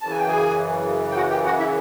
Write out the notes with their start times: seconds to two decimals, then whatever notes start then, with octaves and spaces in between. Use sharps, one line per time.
0.01 F#2 C#3 E3 A5
0.10 G#5
0.19 G5
0.28 G#4 G#5
1.11 G5
1.16 F#4 F#5
1.30 G4 G5
1.45 F#4 F#5
1.59 E4 E5